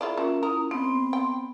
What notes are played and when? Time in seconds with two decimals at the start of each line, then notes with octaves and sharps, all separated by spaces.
0.01 E4 F4 G#4 A#4 D5 E5
0.18 A#3 C#4 F4 F#4
0.43 E4 A#4 D#6
0.71 G#3 B3 C4 C6
1.13 G5